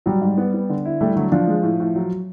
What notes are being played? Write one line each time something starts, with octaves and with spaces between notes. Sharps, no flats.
F#3 G3
G#2
B3
B3
D3
E4
G3 A3
D3 F#3
F3 D4
G#3
A2
A2
F#3